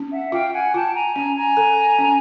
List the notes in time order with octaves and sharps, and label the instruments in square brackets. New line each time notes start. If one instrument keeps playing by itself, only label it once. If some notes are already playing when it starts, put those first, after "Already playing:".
Already playing: [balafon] C#4
[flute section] E5 F#5
[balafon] F4 [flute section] F5 G5
[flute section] F#5 G#5
[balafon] F4 [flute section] G5 A5
[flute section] G#5 A#5
[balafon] C#4 [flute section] G#5 A#5
[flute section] G#5 A#5
[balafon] A4
C#4